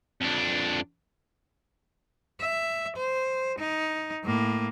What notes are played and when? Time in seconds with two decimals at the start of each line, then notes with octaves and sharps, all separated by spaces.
0.21 F2 D4
2.41 E5
2.96 C5
3.59 D#4
4.24 A2 A#3